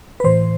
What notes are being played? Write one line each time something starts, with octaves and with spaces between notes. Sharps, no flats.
B4
A2 E3 C5